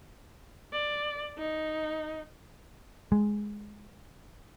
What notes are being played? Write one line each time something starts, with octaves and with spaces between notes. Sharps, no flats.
D5
D#4
G#3